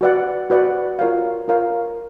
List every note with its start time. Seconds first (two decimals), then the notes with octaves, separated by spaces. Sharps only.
0.01 F#4 B4 D5 F#5
0.50 F#4 B4 D5 F#5
0.99 F4 A#4 C#5 F5
1.48 F4 A#4 C#5 F5